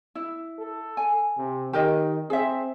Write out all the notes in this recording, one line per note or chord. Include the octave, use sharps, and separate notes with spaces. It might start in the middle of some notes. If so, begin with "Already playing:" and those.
E4
A4
G#5
C3
D#3 G4 A#4 D#5
C4 G#4 E5